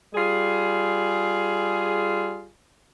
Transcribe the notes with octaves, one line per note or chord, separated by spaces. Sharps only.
G3 F4 G#4